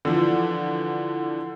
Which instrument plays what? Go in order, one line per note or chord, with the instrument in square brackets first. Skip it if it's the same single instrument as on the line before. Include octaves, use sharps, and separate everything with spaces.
[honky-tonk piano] D3 E3 F3